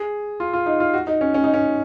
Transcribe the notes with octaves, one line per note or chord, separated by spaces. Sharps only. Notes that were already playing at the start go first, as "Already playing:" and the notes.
Already playing: G#4
F4
F4
D#4
F4
F#4
D#4
C#4
C#4
D#4
C#4